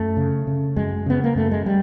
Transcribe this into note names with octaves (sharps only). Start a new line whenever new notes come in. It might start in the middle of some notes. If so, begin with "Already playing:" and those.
Already playing: F#2 A3
C#3
C#3
F#2 G#3
C#3 B3
A#3
F#2 A3
G#3
G3